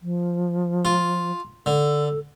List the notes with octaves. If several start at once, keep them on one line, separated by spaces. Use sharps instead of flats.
F3
F4
D3 A4